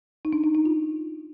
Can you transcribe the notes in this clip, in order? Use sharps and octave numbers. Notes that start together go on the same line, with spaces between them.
D#4
D4
D#4
D#4
F4